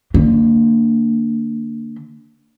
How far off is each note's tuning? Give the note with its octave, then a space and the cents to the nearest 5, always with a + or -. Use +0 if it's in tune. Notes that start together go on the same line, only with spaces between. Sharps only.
D3 +0 A#3 -30